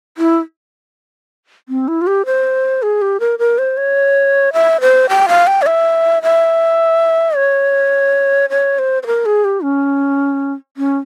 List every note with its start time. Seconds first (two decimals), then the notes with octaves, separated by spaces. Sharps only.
0.18 E4
1.69 C4
1.88 E4
2.01 F4
2.07 G4
2.26 C5
2.82 G#4
3.02 G4
3.20 A#4
3.39 A#4
3.58 C5
3.77 C#5
4.53 E5
4.81 C5
5.09 G5
5.29 F5
5.47 G5
5.62 C#5
5.66 E5
6.23 E5
7.36 C#5
8.50 C#5
8.79 C5
9.03 C5
9.07 A#4
9.26 G#4
9.45 G4
9.63 C#4
10.77 C#4